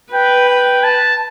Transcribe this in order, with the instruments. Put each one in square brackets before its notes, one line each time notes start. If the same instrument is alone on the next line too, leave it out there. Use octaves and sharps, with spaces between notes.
[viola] B4 [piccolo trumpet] G5
[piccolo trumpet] G5
A5